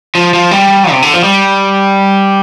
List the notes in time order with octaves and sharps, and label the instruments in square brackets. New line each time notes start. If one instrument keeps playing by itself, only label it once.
[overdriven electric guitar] F3
F3
G3
C3
D3
F3
G3